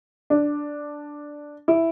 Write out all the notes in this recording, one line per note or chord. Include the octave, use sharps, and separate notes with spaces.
D4
E4